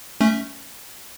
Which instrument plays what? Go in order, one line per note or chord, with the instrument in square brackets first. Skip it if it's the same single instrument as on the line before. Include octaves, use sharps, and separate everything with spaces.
[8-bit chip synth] A3 C#4 E5